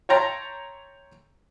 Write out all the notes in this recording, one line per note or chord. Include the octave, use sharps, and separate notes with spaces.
C#5 E5 G5 A5 A#5 C6